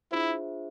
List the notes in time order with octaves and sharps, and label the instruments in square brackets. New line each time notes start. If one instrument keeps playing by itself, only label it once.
[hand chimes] D4 F4 G#4 C5 E5 [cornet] E4